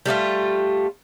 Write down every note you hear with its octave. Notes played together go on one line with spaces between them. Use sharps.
G3 A3 D4 F4